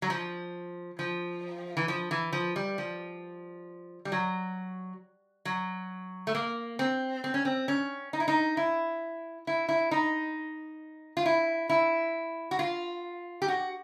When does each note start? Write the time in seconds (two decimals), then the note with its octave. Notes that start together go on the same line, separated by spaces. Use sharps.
0.02 F#3
0.10 F3
0.99 F3
1.77 E3
1.88 F3
2.11 E3
2.33 F3
2.56 G3
2.78 F3
4.05 G3
4.12 F#3
5.45 F#3
6.27 A3
6.35 A#3
6.79 C4
7.24 C4
7.34 C#4
7.45 C4
7.68 C#4
8.13 D#4
8.20 E4
8.28 D#4
8.57 E4
9.47 E4
9.69 E4
9.91 D#4
11.17 F4
11.26 E4
11.69 E4
12.51 F#4
12.59 F4
13.42 G4
13.48 F#4